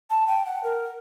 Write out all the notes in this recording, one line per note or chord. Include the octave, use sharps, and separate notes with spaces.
A5
G5
F#5
A#4